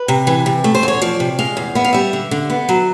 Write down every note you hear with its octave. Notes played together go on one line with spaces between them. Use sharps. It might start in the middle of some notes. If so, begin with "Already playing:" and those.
Already playing: B4
C3
E3
C3
A3
C5
E2 C#5
F3 D5
C3
G#3 F5
E2
B3 E5
F5
G3 E5
D3
D3
B3
F#3